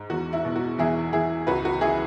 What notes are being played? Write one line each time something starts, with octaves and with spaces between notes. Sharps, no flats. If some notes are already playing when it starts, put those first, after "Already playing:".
Already playing: G#2
E2 F#4
E4
B2
F#4
E2 E4 G#4
E2 E4 G#4
C#2 F#4 B4
F#4
C#2 E4 G#4